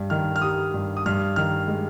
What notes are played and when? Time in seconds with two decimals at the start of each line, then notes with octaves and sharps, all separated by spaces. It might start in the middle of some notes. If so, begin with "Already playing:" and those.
Already playing: G2
0.10 D#3 F6
0.36 F6
0.42 G3 D#6
0.74 G2
0.97 D#6
1.06 G2 F6
1.36 D#3 F6
1.68 G#3